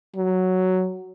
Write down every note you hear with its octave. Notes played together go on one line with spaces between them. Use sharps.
F#3